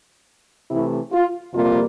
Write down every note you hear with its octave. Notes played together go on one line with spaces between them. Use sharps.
C3 E3 A3 E4
F4
F2 C3 G3 A#3 F4